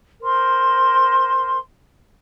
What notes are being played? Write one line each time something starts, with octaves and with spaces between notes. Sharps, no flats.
A#4 C5 C6